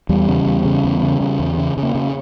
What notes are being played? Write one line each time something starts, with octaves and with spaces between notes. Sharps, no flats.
E2 G3
C#3
E2
C#3
E2
C#3
C#3
E2
C#3
C#3
A#3
C#3